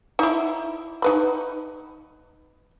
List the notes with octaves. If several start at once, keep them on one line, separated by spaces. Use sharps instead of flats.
D#4 E4
D#4 B4 B5